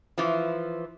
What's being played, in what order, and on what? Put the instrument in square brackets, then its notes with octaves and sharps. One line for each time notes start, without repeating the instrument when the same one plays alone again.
[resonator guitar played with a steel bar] E3 F3